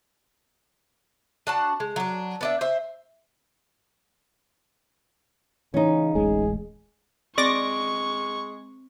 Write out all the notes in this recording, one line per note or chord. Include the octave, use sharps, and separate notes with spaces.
D4 F#4 A5
G#3
F#3 D4
B3 D4 E5
C5 E5
C#3 E3 C#4 D#4
D1 A1 G#3 G#4
G#3 C4 D5 C#6 D6 A#6